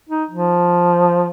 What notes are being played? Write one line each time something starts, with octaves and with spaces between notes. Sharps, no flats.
D#4
F3